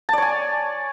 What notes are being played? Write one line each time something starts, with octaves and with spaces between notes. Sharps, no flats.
C#5 D5 G#5 A5